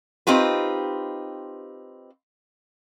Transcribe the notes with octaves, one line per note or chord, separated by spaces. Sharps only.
C4 D#4 F4 G4 B4